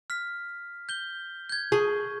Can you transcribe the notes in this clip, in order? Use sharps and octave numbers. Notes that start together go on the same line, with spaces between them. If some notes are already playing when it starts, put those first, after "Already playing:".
F6 B6
G6 G7
G6 G#6
G#4 C#6